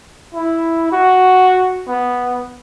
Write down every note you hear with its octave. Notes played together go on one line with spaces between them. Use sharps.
E4
F#4
B3